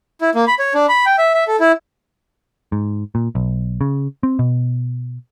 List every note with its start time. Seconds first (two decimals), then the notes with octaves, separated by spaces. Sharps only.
0.21 E4
0.35 A#3
0.47 B5
0.59 C#5
0.75 D4
0.89 B5
1.06 G5
1.18 E5
1.34 E5
1.48 A4
1.60 E4
2.72 G#2
3.15 A#2
3.35 B1
3.81 C#3
4.23 C4
4.39 B2